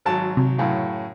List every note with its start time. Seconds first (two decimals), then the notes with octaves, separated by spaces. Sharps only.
0.05 G#1 F#3 A5
0.37 C3
0.58 F#2 A2 C#3